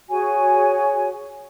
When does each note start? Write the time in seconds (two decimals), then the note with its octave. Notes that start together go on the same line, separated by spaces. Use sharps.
0.10 F#4 G#4 C#5 G#5